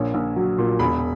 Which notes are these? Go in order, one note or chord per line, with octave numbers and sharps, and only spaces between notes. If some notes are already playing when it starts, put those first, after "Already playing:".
Already playing: A#1 A#2 C#5
A#1
F#3
A#2
E1 B5